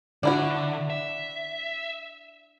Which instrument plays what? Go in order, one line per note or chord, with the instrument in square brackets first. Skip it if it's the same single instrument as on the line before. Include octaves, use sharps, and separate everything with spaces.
[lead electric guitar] D3 [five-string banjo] D4 E4 F#4
[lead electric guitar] E5